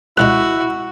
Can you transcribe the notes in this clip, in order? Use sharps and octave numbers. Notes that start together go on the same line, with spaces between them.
C#2 G3 G#3 E4 F#4 F#6